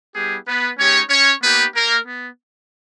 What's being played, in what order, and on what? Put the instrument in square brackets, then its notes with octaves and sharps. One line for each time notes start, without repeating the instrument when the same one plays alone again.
[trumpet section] G3 B3 E4 G4 G#4
B3 B4
G#3 C#4 D#4 G4 C#5
C#4 C#5
A#3 B3 D#4 G4 B4
A#3 A#4
B3